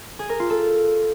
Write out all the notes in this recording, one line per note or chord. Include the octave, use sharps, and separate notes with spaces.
G#4
A#4
F4
A4